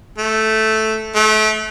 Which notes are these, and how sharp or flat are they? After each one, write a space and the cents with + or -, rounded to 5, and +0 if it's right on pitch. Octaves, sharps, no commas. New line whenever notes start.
A3 -5
A3 -30